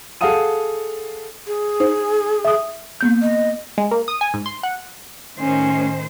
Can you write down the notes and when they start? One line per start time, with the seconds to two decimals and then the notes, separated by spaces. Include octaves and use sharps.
0.21 G#4 A4 F5 F#5 D#6 D#7
1.47 G#4
1.80 D#4 C5
2.45 E5 D#6
3.01 A#3 B3 G6
3.22 D#5
3.78 G#3
3.91 A#3
4.08 D#6
4.21 G#5
4.34 G#2
4.46 C6
4.63 F#5
5.40 A2 D#3 C#4 C5